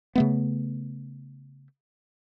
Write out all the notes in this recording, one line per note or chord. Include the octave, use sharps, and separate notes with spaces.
C#3 A3 B3